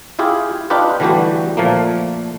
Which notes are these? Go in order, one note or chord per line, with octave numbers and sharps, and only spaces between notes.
E4 F4 G4 G#4
D4 D#4 F4 G4 B4
D3 E3 G3 A3 F#4 G4
A#2 F3 A3 A#3